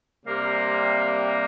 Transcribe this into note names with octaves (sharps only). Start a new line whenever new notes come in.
C3 G3 A#3